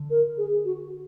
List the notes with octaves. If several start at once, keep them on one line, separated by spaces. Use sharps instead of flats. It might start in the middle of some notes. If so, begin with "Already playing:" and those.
Already playing: D3
A#4
G#4
F#4